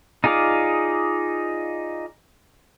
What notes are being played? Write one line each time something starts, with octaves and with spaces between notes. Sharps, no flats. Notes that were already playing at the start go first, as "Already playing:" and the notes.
D#4 F4 G#4 D5 F5